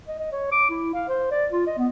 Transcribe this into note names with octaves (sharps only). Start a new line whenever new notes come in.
D#5
D#5
C#5
D6
E4
F5
C5
D5
F4
D#5
B3